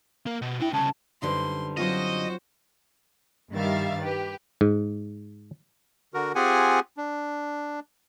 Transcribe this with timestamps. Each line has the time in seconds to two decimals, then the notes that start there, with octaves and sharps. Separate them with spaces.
0.26 A#3 A#4
0.42 B2
0.60 D4 E4 G5
0.73 C2 C#3 A5
1.22 F#2 D3 G3 D#4 B4 C5 C6
1.77 F#3 C4 F4 F#4 C5 D#5
3.53 G2 D#3 G3 E5 F5 A6
3.99 G4 B4
4.61 G#2
6.14 D3 F#4 A#4
6.35 C4 F4 G4 G#4 F#5 G#5
6.97 D4